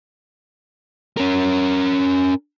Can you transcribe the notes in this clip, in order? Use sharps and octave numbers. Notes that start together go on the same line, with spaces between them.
C#4 A#4